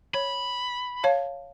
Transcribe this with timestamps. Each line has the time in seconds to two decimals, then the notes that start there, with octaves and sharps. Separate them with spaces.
0.14 C#5 B5
1.04 C#5 F5 A5